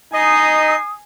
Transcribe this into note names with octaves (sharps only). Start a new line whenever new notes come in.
D#4 D#5 G#5 D#6 C7